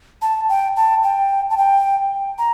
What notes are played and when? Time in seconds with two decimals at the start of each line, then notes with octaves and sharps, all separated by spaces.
0.22 A5
0.49 G5
0.76 A5
1.03 G5
1.50 A5
1.57 G5
2.38 A#5